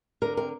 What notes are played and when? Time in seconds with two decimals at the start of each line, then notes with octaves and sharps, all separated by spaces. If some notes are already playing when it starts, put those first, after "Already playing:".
0.22 D3 A#4
0.37 C4 A#4